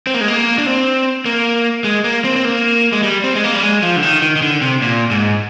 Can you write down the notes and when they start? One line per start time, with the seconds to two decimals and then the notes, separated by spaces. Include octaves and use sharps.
0.07 C4
0.14 A#3
0.21 G#3
0.28 A#3
0.58 D4
0.66 C4
1.26 A#3
1.84 G#3
2.04 A#3
2.24 C4
2.36 C4
2.45 A#3
2.92 G#3
3.03 G3
3.24 C4
3.35 G#3
3.44 A#3
3.55 G3
3.63 G#3
3.83 F3
3.96 D3
4.03 D#3
4.22 D#3
4.36 D#3
4.42 D3
4.61 C3
4.82 A#2
5.11 G#2